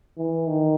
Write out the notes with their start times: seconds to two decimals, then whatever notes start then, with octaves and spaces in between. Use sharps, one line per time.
0.17 E3
0.47 D#3